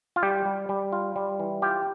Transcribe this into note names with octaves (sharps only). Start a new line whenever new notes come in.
F4
G3 G4
G3
G3
F4
G3
E3
F4 G4